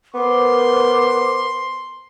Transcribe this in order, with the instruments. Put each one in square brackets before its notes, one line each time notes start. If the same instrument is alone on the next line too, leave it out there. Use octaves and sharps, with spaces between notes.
[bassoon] B3 [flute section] A#4 C5 [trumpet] C6 [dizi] D6